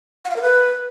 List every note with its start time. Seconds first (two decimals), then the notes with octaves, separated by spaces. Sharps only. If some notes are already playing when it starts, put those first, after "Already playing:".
0.25 F#5
0.30 F5
0.36 A#4
0.42 B4